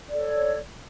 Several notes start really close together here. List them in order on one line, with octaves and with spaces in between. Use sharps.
D5 A4 C#5